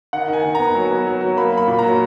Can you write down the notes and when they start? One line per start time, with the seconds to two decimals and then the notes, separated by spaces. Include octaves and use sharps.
0.13 D#3 F#5
0.28 D#3
0.33 G#5
0.44 D#3
0.55 B3 A#5
0.75 F#3
0.91 B3
1.07 F#3
1.21 F#3
1.37 A#3 B5
1.52 A#3
1.58 B5
1.67 A#2
1.79 F#3 A#5